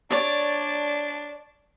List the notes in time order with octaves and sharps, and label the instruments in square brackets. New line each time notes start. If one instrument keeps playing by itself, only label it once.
[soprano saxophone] D4 [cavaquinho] C#5 D5